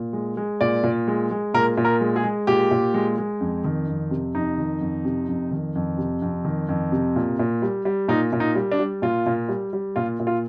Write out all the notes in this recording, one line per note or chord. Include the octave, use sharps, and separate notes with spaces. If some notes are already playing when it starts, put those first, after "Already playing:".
Already playing: A#2
G#3
G#3
A#2 D5
A#2
G#3
G#3
A#2 A#4
A#2
A#4
G#3
G#4
G#3
A#2 G4
A#2
G#3
G#3
F2
D#3
F2
C3
F2 D#4
D#3
F2
C3
F2
D#3
F2
C3
F2
D#3
F2
C3
A#2
A#2
G3
G3
A#2 D#4
A#2
D#4
G3
D4
G3
A#2 F4
A#2
G3
G3
A#2 F4
A#2
F4